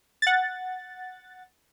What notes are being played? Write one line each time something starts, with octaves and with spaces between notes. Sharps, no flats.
F#5 A6